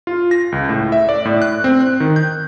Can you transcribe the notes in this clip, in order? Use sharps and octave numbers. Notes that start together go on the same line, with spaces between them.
F4
A#6
C#2
A2
E5
D5
A2
F#6
C4
F#6
D#3
G6